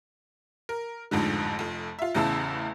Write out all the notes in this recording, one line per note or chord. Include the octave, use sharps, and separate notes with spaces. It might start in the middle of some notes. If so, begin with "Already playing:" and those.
A#4
A1 F2 G#2 D3
F1 F2
F4 E5
A1 E2 C#3 E4 A5 E6